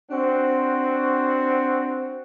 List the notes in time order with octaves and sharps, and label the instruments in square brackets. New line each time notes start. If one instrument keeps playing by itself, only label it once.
[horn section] C4 D4 F#4